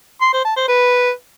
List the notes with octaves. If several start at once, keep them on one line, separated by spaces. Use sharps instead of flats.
C6
C5
A5
C5
B4